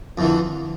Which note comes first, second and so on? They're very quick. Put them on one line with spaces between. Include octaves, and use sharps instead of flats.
F2 E3 D3